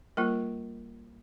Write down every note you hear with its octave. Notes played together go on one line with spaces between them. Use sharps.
G3 A#3 F4 A#4